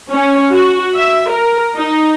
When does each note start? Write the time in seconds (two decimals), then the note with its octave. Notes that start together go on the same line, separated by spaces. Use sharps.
0.10 C#4
0.52 F#4
0.96 E5
1.32 A#4
1.76 D#4